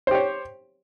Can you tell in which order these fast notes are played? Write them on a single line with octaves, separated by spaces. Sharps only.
C5 G4 C#5